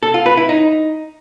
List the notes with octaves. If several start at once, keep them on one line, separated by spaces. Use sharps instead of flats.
A4
F4
B4
E4
D#4